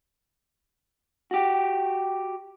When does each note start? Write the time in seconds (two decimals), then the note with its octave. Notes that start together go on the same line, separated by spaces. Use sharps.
1.31 F#4 G4